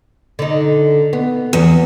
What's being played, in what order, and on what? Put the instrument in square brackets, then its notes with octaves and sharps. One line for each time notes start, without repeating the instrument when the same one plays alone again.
[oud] D3 D#4
B3
[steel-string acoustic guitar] E2